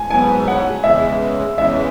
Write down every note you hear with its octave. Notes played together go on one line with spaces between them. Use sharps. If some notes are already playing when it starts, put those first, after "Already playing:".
Already playing: G#5
G#2 F#3 B3 G#5
F#5
E2 C#3 E3 G#3 E5
E2 C#3 E3 G#3 E5